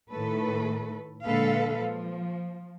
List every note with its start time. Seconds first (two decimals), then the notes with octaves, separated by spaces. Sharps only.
0.10 A2 D#3 A3 A4 B4
1.25 A#2 D3 G#3 A4 B4 F5
1.76 F3